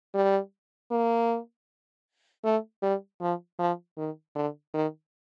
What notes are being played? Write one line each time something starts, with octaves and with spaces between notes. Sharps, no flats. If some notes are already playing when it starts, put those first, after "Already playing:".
G3
A#3
A3
G3
F3
F3
D#3
D3
D#3